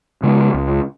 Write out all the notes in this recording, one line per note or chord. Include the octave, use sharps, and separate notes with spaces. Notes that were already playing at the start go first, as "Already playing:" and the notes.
C#3 G#3 B3
C#2